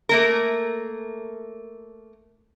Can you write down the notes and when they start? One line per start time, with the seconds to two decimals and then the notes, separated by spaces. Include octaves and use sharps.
0.09 A3 A#3 A#4